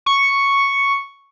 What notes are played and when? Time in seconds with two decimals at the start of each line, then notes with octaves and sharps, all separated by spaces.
0.06 C#6